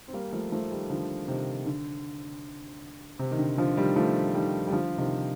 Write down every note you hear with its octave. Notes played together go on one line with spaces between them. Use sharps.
C4
G3 A#3
F3 A3
F3 A3
D#3 G3
D3 F3
C3 D#3
D3
C3
D#3
D3
D3 F3
D#3 G3
F3 A3
D#3 G3
G3
D3 F3
C3 D#3